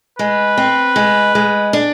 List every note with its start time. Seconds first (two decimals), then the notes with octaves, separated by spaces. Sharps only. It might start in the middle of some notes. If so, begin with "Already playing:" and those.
0.19 G#3 B4
0.58 C4
0.96 G#3
1.35 G#3
1.73 D4